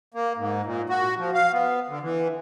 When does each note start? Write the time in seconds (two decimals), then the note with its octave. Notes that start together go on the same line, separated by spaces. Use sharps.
0.14 A#3
0.37 G#2
0.65 A#2
0.89 F#4
1.18 F3
1.34 F5
1.52 B3
1.89 D3
2.02 E3